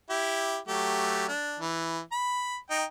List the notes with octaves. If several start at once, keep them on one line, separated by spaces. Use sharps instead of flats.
E4 G4
F#3 A3 G4
D4
E3
B5
D#4 G5